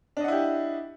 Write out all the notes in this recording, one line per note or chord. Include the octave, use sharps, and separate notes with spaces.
D4 E4 G4 D#5 F#5